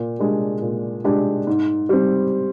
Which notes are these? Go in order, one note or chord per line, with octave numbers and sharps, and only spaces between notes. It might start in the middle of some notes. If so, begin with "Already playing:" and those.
Already playing: A#2
G#3 D4 G4
A#2
G#3 D4 G4
G#2
G3 C4